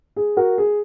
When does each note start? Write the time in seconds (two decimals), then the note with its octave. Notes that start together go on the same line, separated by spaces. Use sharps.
0.16 G#4
0.37 F#4 A#4
0.58 G#4